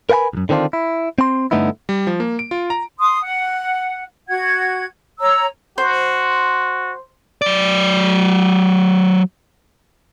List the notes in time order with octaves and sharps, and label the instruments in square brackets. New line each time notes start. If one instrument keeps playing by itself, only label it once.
[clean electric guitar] A#4 B4 F5 F#5 G#5 B5
B1 F#2
D3 D#3 C4 D4 F4
E4
C4 C6
G2 D3 A3 B3 D#4 E4
[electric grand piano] G3
F3
A#3
D7
F4
A#5
[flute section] C6 D#6
F#5
F#4 F#5 G#6
C#5 A#5 E6
[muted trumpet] F#4 [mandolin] C5
[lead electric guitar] F#3 D5